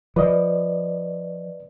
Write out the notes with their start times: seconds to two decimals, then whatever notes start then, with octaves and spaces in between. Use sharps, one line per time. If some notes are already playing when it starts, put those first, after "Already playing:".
0.16 F3 B4 D5 D#5